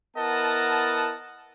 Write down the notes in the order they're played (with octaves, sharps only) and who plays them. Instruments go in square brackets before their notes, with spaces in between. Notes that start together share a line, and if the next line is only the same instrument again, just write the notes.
[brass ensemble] B3 E4 A#4 D#5 F#5 A5